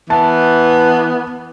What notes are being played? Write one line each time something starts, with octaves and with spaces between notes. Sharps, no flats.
E3 B3 A5